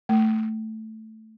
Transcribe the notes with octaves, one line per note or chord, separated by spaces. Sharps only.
A3